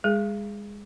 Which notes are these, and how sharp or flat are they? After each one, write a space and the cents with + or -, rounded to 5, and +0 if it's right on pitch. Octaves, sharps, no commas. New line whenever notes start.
G#3 -25 G#4 +0